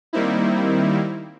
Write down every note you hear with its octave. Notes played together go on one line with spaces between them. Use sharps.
D#3 G3 A#3 C4 D#4 E4